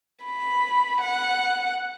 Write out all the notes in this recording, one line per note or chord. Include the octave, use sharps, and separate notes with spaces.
B5
F#5